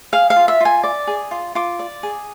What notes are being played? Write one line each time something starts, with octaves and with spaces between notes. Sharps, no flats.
G#4 F5
F5
F4
E5
F4 G#5
D5
G#4
F4
F4 D6
D5
G#4